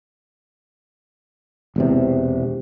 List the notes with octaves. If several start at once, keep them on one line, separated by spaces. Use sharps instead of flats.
E1 E2 C3